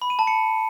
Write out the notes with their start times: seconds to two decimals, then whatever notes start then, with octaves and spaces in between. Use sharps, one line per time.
0.02 B5
0.10 D#7
0.19 A5
0.27 C#7